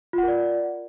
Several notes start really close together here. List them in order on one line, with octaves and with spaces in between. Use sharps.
F4 F#5 A#4 D5